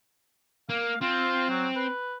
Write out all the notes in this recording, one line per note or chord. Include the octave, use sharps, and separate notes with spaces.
A#3 F5
C4 F4
F#3
B4